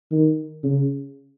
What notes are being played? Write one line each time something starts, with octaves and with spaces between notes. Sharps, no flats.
D#3
C#3